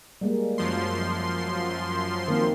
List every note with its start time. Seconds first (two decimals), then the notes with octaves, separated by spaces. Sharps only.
0.21 G3 G#3 A#3
0.58 F#2 F3 C6
2.28 D#3 A#3 C4